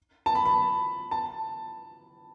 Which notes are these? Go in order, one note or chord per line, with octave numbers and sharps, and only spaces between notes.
A5
B5
B5
A5